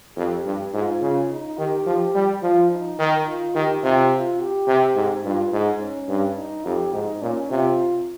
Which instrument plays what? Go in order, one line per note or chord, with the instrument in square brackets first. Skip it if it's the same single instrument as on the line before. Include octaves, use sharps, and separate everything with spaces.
[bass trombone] F2 [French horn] G4
[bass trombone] G2
[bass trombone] G#2 [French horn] F4
[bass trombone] C#3
[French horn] D#4
[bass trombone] D#3 [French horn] G4
[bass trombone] F3
G3
[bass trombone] F3 [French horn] F4
[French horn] D#4
[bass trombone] D#3
[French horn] F4
[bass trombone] D#3 [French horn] G4
[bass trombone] C3 [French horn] F4
[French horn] F4
G4
[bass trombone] C3
G#2
[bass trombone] G2 [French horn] F4
[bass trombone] G#2
[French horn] C#4
[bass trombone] G2
[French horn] D#4
[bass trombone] F2 [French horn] G4
[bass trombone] G#2 [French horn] D#4
[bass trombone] A#2 [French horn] C#4
[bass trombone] C3 [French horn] F4